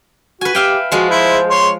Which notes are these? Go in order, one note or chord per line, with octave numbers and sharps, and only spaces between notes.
F#4 B4 G#5
G4 E5 F5 G5
F3 G#3 F#4
E4 C5
C#5 C6